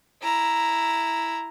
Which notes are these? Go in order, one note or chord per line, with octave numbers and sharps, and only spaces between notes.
E4 A#5